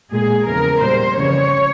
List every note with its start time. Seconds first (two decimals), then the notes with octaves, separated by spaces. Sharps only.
0.12 A#2 G#3 G#4
0.46 E2 C#3 F3 A#4
0.81 A#2 G3 C5
1.15 F2 C#3 E3 G3 C#5